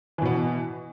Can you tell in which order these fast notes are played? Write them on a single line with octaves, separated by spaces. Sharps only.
E3 B2 B3